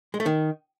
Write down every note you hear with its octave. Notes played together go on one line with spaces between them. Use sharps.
G#3
A3
D#3